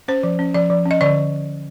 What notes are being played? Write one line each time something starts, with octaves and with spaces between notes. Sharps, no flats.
C#4 C5
F3
C#4
F3 D5
F3
C#4
D#5
D3 D5